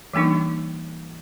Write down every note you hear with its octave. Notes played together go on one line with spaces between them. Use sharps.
E3 G3 A#3 D4 D#4